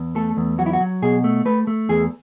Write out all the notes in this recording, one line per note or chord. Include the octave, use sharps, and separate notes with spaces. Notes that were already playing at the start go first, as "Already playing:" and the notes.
Already playing: E2
A3 A4
E2
F#3 F#4
E4
F#4
F#3
B2 G#4
A3
A3 B4
A3
E2 G#4